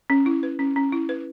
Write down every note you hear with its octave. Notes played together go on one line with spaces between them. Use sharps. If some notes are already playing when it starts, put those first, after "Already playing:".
C#4
E4
B4
C#4
C#4
E4
B4